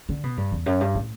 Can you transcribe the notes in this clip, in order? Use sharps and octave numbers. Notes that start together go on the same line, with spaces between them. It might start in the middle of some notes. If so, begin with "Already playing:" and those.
D3
B2
G2
E2
F#2
G2
A2